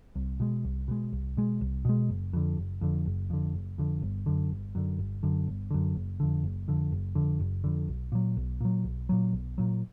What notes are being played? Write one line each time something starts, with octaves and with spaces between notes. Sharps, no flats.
C2
B2 G#3
C2
B2 G#3
C2
B2 G#3
C2
B2 G#3
F#1
F2 D3
F#1
F2 D3
F#1
F2 D3
F#1
F2 D3
G1
F#2 D3
G1
F#2 D3
G1
F#2 D3
G1
F#2 D3
F#1
F2 D3
F#1
F2 D3
F#1
F2 D3
F#1
F2 D3
B1
A#2 F#3
B1
A#2 F#3
B1
A#2 F#3
B1
A#2 F#3